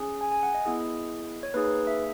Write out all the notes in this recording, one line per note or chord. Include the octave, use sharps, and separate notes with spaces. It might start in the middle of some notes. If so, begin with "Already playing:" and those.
Already playing: C#4 G#4
G#5
G#5
F#5
D#5
B3 E4 G#4
C#5
A#3 D#4 G#4 B4
B4
E5